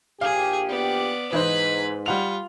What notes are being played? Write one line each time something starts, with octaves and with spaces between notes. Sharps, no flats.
A#1 G4 G#4 F5 G#5
B3 D5
G#2 E3 D#4 B4 C5 B5
G3 F4 F#5 F7